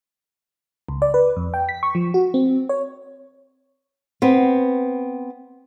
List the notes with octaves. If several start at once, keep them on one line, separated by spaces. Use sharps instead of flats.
C#2
D5
B4
F2
G5
B6
C#6
F3
F#4
C4
C#5
B3 C4